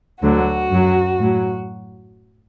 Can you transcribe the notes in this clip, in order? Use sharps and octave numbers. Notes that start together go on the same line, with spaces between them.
D2 D3 F#3 F#4
F#2 F#3
A2 F#3